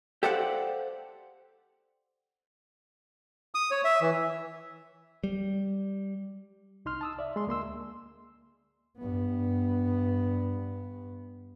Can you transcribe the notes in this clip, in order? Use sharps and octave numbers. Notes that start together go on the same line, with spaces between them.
G4 A4 C5 D5 F5 F#5
D#6
C#5
E5
E3
G3
C2 D#4 C6 F6
A5 D#6 E6
D5 E5
G#3 C6
D2 A#3 C6 E6
G2 B3